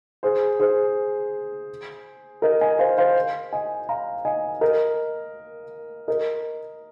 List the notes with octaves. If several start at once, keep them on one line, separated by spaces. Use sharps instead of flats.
G#4 C5
G#4 C5
A#4 D#5
D#5 G#5
C5 F5
C5 F5
D#5 G#5
F5 A#5
D#5 G#5
A#4 D#5
A#4 D#5